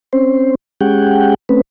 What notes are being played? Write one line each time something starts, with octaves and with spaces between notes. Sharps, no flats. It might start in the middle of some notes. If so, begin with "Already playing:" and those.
C4 C#4 C5
G#3 C#4 G4 G#4 F#5 G5
A3 C4 C#4 B4